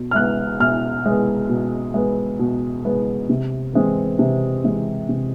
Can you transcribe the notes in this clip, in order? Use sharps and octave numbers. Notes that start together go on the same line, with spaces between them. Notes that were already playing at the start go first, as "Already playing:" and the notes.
Already playing: B2
F6
G#3 B3 F#6
B2 F6
G#3 B3
B2
G#3 B3
B2
G#3 B3
C3
E3 G#3 C4
C3
E3 G#3 C4
C3